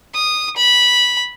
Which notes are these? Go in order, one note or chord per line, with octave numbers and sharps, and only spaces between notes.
D#6
B5